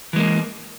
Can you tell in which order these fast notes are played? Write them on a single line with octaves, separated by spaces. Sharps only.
E3 G#3 A#3